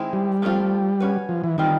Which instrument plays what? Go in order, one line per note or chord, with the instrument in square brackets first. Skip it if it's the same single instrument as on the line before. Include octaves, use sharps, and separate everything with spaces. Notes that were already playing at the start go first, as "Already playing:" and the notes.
Already playing: [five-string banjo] D#3 G#3 C4 E4
[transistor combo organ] G3
[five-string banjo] F3 A3 C4 F4
C#4 F#4 B4
[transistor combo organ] F3
E3
[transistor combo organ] D#3 [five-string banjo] G3 C4 F4